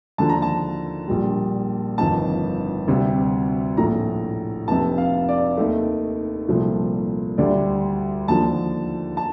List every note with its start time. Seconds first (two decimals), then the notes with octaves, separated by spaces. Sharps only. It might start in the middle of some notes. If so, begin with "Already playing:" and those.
0.18 D#2 D3 F3 A5
0.29 A#5
0.42 A5
1.08 A#1 A#2 G3
1.98 G1 F2 D#3 A5
2.88 D2 C3 G3
3.77 A#1 A2 A3 A#5
4.68 F1 F2 C3 A5
4.98 F5
5.28 D5
5.57 D#2 D#3 A3
6.48 C2 A#2 F3 A3
7.38 D2 D3 G3 D5
8.28 D#2 D3 F3 A5
9.17 A5